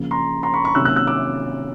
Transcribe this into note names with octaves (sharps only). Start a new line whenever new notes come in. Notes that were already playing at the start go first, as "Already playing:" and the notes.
Already playing: C#3 F3 A#3
A#5 C6
A#5 C6
B5 C#6
B5 C#6
C3 D#3 F#3 A#3 C#4 E6 F#6
E6 F#6
E6 F#6
D6 E6